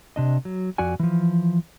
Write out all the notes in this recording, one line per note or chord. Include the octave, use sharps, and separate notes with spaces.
C3 D4 D#5
F#3
F2 F#4 D5 F#5 G#5
E3 F3